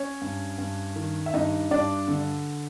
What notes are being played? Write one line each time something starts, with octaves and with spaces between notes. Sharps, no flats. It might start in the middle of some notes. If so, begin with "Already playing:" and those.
Already playing: C#4 C#5
G2
G2
D#3
E5
G2 D#4 D#5
G2 D4 D5
D3